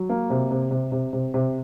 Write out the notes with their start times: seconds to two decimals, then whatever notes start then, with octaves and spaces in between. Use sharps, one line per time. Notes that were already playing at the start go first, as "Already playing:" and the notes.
Already playing: F#3
0.09 A#3
0.30 C3
0.51 C3
0.71 C3
0.92 C3
1.13 C3
1.34 C3